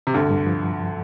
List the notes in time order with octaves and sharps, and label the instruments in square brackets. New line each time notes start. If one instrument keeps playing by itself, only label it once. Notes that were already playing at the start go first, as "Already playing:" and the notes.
[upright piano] C3
[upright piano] D2 D3 [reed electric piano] G2
[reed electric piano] G2
F3